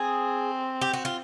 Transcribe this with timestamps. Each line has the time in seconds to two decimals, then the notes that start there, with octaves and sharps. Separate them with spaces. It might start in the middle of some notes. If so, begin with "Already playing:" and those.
Already playing: C4 G#4
0.81 G4
0.93 F#4
1.05 F4